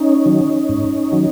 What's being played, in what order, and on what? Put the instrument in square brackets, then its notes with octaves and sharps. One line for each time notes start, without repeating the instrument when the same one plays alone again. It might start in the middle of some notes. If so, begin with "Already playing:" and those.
Already playing: [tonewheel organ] C#4 D#4
D#3 F#3
G#2
D#3 F#3